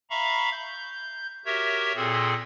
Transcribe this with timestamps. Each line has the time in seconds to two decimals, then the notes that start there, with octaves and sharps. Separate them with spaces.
0.10 E5 F5 A#5 B5 C#6
0.51 G6
1.45 F#4 G4 A#4 C#5 E5
1.95 A#2 C4 G#4 A4